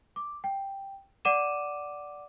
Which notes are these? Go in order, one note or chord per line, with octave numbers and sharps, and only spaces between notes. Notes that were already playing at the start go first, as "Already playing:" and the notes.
D6
G5
D5 F#5 D6 D#7 E7